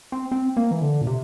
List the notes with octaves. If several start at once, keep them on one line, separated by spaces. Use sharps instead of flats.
C4
C4
A#3
E3
D3
A#2
C3